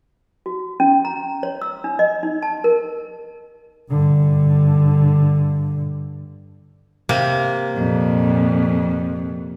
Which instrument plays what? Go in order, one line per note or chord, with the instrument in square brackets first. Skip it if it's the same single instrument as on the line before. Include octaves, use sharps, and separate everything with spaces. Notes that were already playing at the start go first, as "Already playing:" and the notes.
[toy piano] F#4
C#4
A#5
C#5
E6
D4
D#5
D#4
A5
A#4
[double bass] G2 D3
[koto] C3 A#3
[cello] F2 A#2